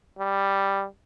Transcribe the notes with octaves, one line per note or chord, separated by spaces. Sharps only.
G3